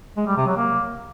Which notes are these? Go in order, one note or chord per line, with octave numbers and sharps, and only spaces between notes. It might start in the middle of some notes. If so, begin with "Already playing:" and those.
G#3
G3
C3
F#3
A#3